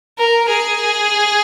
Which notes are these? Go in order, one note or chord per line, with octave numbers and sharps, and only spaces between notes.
A#4
G#4